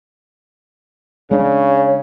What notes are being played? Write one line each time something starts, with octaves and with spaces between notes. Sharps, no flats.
C#3 G#3 D4 C#5